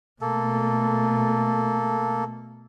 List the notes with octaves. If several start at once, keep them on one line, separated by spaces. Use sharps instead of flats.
B2 A3 A#3 A4